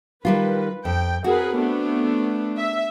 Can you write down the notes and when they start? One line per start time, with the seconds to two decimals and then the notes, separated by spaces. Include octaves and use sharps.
0.25 D#3 G3 F4 B4
0.85 F2 G5
1.24 C4 F#4 G#4 A#4 B4
1.56 A3 B3 D4
2.57 E5